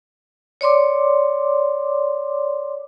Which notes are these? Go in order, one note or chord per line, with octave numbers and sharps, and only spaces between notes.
C#5 D5 C6 D6